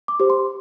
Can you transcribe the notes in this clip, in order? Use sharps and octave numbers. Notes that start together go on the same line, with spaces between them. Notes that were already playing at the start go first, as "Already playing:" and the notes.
D6
G4 C5
C6